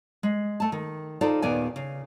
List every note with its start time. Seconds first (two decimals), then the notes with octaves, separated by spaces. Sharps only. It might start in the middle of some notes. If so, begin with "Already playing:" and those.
0.23 G#3
0.60 A3 A5
0.72 D#3
1.21 D#4 F4 A4 C5 D5
1.42 D#2 A#2 D#3 B3 D5 G#5
1.76 C#3